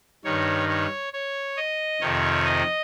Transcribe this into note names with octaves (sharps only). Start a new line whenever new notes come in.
G2 D#3 C#5
C#5
C#5
D#5
F2 C3 D#3 C#5
D#5